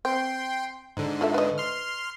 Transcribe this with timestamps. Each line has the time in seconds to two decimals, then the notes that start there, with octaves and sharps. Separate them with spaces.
0.05 C4 G5 C6
0.97 G#2 D3
1.21 F4 A4 E5
1.34 B4 D#5
1.58 C6 F6